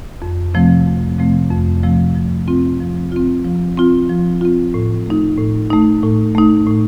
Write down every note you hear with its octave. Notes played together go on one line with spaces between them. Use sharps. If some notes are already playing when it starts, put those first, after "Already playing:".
F2
C3 F3 A3 C4
F2
C3 F3 A3 C4
F2
C3 F3 A3 C4
F3
C4 F4
F3
C4 F4
F3
C4 F4
F3
C4 F4
A2
A3 D#4
A2
A3 D#4
A2
A3 D#4
A2